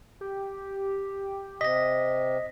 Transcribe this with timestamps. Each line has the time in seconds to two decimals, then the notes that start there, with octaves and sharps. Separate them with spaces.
0.21 G4
1.61 C3 D#5 A#6 B6